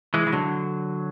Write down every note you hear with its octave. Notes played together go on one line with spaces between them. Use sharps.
E3 G#3
E3
D3 F#3